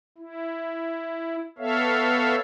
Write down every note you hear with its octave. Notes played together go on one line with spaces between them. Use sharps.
E4
B3 A4 C#5 E5 F5